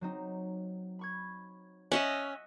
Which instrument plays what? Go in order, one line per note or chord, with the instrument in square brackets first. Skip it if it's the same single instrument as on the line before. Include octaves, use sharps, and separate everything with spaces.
[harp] F#3 C4 D#4
B5 C#6 G#6
[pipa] C#4 [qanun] D#5 E5 F#5